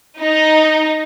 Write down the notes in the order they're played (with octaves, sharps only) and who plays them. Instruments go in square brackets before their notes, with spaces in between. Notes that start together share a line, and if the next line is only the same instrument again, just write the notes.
[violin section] D#4